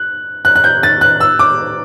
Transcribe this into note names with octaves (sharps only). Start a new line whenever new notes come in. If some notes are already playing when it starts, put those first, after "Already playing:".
Already playing: F#6
F#6
F#6
G6
A6
F#6
E6
D6